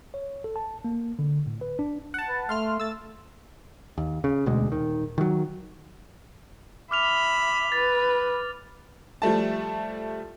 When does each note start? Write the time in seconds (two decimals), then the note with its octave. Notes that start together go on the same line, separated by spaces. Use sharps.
0.14 C#5
0.44 A4
0.56 A5
0.84 A#3
1.19 D3
1.46 A2
1.61 B4
1.79 D4
2.14 F#5 A5
2.29 B4
2.49 A3 F5 C6 F6
2.80 A3 E6 A6
3.98 D#2
4.24 C#3
4.46 E1 D2 B2 G#3
4.70 D#1 D#3
5.18 D#3 F3 F#3
6.91 E5 B5 D6 F6 F7
7.72 B4 A6
9.22 F3 G3 A3 A5